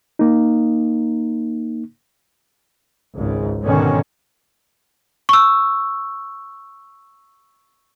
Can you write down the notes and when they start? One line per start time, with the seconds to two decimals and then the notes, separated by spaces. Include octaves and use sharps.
0.19 A#3 D#4
3.15 G#1 C#2 G#2
3.62 G#2 B2 D3 D#3 C#4
5.29 C#6 E6